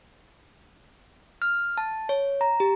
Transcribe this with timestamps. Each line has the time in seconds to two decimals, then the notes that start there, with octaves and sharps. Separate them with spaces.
1.42 F6
1.78 A5
2.09 C#5
2.41 A#5
2.60 G4